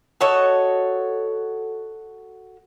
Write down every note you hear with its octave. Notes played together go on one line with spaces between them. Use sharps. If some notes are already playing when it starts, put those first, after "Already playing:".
F#4 A4 C#5 D#5